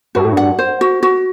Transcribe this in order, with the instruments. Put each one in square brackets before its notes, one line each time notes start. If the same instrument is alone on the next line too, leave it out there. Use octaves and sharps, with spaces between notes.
[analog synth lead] G2 [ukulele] F#4
[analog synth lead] A2
[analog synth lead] G2 [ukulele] F#5
[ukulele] C5
F#4
F#4